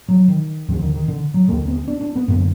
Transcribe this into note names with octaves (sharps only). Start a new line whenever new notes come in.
F#3
D#3
D#2 D3 F3
D#3
D#3
D3
F#3
D#2 D3 A#3
B3
D4
D4
B3
F#2 D3 A#3